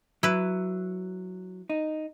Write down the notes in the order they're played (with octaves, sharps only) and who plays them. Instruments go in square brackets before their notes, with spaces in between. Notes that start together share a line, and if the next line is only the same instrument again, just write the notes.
[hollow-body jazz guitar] F#3 [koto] E4 B4
[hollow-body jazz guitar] D#4